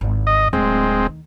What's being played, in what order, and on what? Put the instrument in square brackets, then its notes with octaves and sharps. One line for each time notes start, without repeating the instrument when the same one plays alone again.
[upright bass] G#1 E2
[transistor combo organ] D#5
[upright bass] D1 [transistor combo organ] G#3 C4
[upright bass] D#3